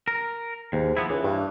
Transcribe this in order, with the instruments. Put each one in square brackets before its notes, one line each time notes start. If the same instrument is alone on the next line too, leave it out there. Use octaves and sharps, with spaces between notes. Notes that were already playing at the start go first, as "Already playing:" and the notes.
[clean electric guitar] A#4
[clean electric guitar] D#2 [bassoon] G#2
[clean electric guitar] F3 B3 E4
[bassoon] C#2 [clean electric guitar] E3
[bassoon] G2